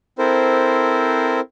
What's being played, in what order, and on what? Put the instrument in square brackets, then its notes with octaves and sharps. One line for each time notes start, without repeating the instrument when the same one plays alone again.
[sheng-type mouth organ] C4 E4 A4 A#4 C5